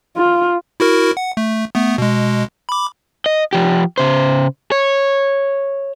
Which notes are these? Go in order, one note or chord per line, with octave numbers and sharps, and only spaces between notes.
F4
E4 F#4 A#4
F#5
A3
A3 B3
B2 G#3
B5 D6
D#5
F3 G4
C#3 C5
C#5